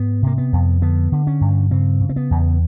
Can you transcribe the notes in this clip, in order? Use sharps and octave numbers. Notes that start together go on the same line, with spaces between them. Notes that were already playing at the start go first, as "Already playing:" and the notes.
Already playing: G#2 B3
C3 A#3
B3
F2
D3 B3
D3
C#4
G2
C#3 C4
C#3
C4
B3
E2